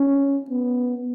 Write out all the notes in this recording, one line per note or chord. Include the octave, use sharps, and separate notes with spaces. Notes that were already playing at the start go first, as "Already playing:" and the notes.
Already playing: C#4
B3